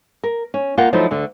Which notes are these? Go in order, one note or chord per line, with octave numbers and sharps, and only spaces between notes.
A#4
C#4
A#3 F4 A#4 F#5 G5
F3 F#3 A3 D#4 E4 C5
D2 D3